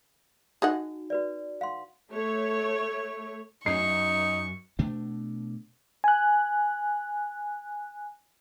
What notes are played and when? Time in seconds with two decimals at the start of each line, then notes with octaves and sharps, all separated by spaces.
0.62 D#4 F#4 G#4 D#5 F#5
1.10 F#4 B4 D5
1.61 F5 F#5 C6
2.10 A3 C#5
3.66 F#2 D#4 C#6 C7
4.79 B2 A3 D4
6.04 G#5 F#6